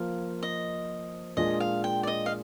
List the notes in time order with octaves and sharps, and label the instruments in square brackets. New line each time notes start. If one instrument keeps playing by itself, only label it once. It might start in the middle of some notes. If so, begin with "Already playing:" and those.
Already playing: [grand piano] F3 A#3 F4 [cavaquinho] F5
[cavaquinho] D#5
[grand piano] A#2 G#3 D4 F4 G#4 [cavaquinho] D#5
[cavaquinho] F5
G5
D5
D#5
F5